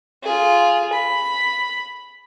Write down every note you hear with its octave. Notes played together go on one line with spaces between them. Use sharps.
F4 G#4
B5